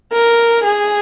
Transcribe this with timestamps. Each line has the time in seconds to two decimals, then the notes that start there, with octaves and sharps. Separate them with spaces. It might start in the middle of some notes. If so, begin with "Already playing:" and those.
0.13 A#4
0.64 G#4